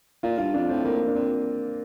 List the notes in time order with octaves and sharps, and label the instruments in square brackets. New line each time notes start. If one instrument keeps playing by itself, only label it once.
[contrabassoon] A#2 [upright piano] F4
[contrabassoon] G2 [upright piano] F4
[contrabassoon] F2 [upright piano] D4
[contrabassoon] A2 [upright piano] C4
[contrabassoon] A2 [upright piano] A#3
[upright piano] D4
[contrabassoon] A#2 [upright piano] C4